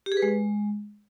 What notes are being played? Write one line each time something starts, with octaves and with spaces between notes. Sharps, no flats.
G4
G#4
B4
G#3